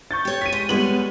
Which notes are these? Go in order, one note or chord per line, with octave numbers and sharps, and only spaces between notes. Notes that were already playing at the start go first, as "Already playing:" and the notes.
C#6 G6 A6
G4 C#5
B6 D#7
G#3
G3 G#3 B3 C#5 F#7